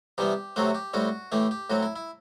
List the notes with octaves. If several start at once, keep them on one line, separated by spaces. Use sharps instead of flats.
C3 E3 G3 B3 G4
C3 F#3 A3 C4 F#4
G4
A2 G3 C4 F#4
A2 E3 A3 G4
G4
A2 F#3 C4 F#4
E4
E4